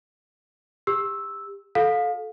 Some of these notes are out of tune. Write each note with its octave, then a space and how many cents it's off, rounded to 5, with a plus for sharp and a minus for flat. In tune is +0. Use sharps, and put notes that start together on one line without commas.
G4 +25 E6 -5
F#4 -30 A4 -15 F5 +25